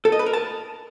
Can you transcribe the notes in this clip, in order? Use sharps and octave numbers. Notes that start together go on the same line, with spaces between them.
A4
D#5
B4
A#4
A5